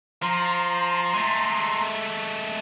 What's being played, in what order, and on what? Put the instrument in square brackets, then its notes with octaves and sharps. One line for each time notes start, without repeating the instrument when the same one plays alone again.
[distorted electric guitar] F3 [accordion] A#5 C6
[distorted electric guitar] G#3 A3